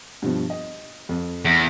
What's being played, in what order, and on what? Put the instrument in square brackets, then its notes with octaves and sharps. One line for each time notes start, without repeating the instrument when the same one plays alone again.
[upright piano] G2 B2 F3
D#5
F2
[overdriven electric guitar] E2